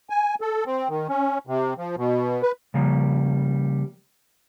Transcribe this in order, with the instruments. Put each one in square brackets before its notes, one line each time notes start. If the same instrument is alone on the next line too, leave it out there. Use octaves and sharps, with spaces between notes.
[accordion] G#5
A4
C4
D#3
C#4
C3
F3
B2
B4
[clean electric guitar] C#3 F3 G3 A#3